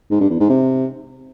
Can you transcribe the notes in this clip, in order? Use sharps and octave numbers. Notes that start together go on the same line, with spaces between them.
G#2
G2
E2
G#2
C3